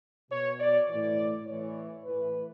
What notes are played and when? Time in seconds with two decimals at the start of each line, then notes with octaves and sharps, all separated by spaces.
0.31 B2 C#5
0.60 D5
0.89 A2 E3 D5
1.47 A2 E3 C#5
2.05 A2 E3 B4